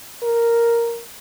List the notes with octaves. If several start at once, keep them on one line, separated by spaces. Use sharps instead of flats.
A#4